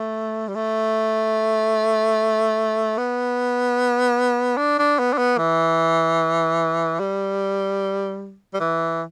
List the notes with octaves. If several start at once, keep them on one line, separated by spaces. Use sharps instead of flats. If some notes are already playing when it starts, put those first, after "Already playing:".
Already playing: A3
G3
A3
B3
D4
D4
B3
D4
B3
E3
G3
G3
E3